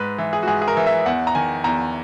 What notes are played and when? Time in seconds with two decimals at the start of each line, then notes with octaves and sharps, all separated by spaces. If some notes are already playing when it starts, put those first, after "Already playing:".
Already playing: G#2 B4
0.18 E3
0.33 G#4
0.43 F#4
0.47 G#2 G#4
0.62 G#4
0.68 A#4
0.77 E3
0.86 E5
1.06 E2 F#5
1.27 A#5
1.35 D#3 G#5
1.64 E2 A#5